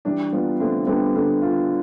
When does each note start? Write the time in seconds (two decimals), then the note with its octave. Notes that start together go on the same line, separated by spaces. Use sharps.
0.05 E3 G3 D4
0.33 G3 B3 F4
0.60 D3 A3 C4
0.87 D3 G3 B3
1.16 D3
1.42 F4